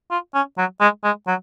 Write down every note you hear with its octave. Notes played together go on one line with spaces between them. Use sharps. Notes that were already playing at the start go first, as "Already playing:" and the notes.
F4
C#4
F#3
G#3
G#3
F#3